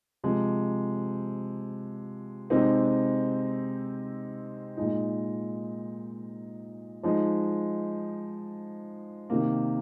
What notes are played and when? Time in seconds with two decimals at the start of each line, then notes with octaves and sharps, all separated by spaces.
0.24 C3 F3 G#3
2.50 C3 G#3 C4 D#4
4.77 A#2 G#3 D#4
7.03 F3 G#3 D#4
9.30 C3 D#3 A#3